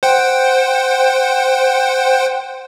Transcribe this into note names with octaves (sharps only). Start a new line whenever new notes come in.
C5 F#5 G5